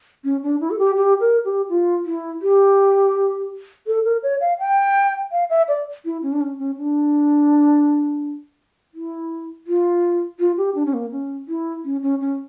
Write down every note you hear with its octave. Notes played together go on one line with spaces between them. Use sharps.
C#4
D4
E4
A4
G4
G4
A#4
G4
F4
E4
G4
A4
A#4
C#5
F5
G5
F5
E5
D5
E4
C#4
D4
C#4
C#4
D4
E4
F4
F4
G4
D4
C#4
A#3
C#4
E4
C#4
C#4
C#4